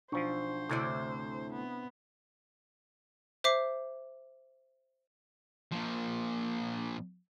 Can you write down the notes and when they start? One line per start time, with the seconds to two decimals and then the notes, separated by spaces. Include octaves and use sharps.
0.12 B1 F3 D4 C5 C#6
0.69 D2 A2 C3 E4 D5
1.52 B3
3.44 C5 E5 D6 C7
5.72 A#2 F3